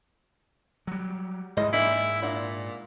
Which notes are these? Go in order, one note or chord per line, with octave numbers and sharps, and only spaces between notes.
F#3 G3
G#2 G#3 E4 D#5
E3 A#3 D4 E4
A#2 D4 F#5